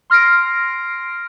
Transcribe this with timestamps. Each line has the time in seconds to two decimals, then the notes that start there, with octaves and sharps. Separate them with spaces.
0.10 C6 F6 A#6 C7 D7